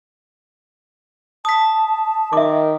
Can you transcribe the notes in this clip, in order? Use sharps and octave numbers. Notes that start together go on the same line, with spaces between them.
A5 D#6 B6
D#3 E5 D6